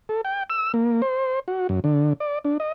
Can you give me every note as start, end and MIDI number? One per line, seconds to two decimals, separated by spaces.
0.09 0.21 69
0.25 0.43 79
0.50 0.72 88
0.74 1.02 58
1.02 1.40 72
1.48 1.67 66
1.69 1.80 42
1.84 2.13 50
2.20 2.39 74
2.45 2.58 62
2.60 2.72 75